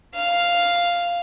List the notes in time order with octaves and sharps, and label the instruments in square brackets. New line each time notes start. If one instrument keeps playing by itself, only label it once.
[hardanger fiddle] F5